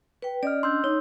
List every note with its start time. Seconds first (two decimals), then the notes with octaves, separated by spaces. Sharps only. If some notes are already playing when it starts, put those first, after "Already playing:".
0.22 B4 G5
0.43 C#4 D5 D#5 F6
0.63 D4 C6 E6 G6
0.84 D#4 C#5